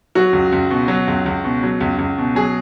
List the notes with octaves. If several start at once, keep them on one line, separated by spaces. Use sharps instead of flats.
F#3 F#4
C#2
C#2
B2
F#3
C#2
C#2
B2
F#3
C#2
C#2
B2
F#3 G#4